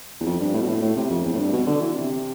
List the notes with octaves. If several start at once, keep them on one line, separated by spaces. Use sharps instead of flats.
E2
F2
G2
A2
B2
A2
A2
C3
F2
E2
A2
G2
B2
D3
E3
C3